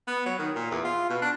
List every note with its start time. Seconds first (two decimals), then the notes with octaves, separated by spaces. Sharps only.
0.07 B3
0.26 F#3
0.39 D#3
0.56 A#2
0.71 E2
0.85 F4
1.10 B2
1.22 D4